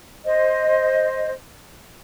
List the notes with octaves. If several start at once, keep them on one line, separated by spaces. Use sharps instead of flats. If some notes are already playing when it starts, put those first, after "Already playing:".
C5 D#5